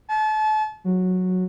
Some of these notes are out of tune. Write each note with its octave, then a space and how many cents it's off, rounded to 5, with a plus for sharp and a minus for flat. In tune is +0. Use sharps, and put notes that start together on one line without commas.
A5 -35
F#3 -10